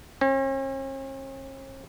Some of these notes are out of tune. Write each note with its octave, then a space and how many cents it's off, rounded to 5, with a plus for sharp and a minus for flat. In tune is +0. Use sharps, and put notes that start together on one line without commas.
C#4 -45